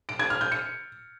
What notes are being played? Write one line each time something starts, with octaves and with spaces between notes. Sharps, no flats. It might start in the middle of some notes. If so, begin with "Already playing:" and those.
D7
G#6
F6
G6
C#7